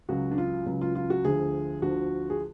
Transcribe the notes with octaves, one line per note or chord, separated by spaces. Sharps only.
C#2 C#3 F#3 F#4
D4
F4
C#2 C#3 F#3
F4
F4
F#4
D2 D3 F3 G#4
D2 D3 F3 F#4
G#4